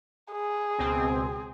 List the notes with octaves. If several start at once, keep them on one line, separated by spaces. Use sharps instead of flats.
G#4
C#2 B2 C4